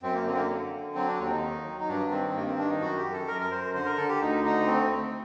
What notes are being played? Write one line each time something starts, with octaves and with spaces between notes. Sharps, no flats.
F#2 C4
A#3
D3 C4
A#3
D3
D3
F#3 C4
D4
D#2 C4
D#4
D#3
F#3
D#4
G2 D4
D#3 C4
G2 A#3
C4
D#3 D4
D#4
F#2 F#4
G4
F#2
A4
F#2 A#4
A#4
F#2 C5
D3 C5
A#4
D3 A4
G4
D2 D#4
D3 D#4
A3 C4
A3